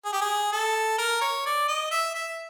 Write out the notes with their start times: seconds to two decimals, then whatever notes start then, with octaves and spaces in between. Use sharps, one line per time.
0.05 G#4
0.13 G4
0.22 G#4
0.53 A4
0.99 A#4
1.21 C#5
1.46 D5
1.68 D#5
1.91 E5
2.15 E5